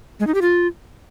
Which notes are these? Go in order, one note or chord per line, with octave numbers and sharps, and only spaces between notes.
G#3
D#4
G4
F4